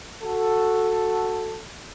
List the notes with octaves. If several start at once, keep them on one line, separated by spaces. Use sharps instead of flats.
F#4 A4